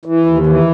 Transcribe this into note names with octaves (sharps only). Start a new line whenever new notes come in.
E3
D#2
E3